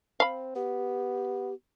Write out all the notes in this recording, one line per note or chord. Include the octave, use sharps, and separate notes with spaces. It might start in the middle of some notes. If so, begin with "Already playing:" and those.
C4 F5 B5
B3 G4